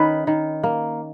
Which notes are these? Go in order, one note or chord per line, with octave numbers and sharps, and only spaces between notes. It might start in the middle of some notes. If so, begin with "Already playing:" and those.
Already playing: D#3 C#4 B4
D#3
A#3